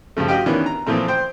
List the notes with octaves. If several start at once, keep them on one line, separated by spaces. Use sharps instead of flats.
G2 C#3 F3 A3
F#4 G4 D#5 F5 G5
D#3 E3 B3 C#4 D4
A#5
A#2 E3 F3 A3 C4
C5 G5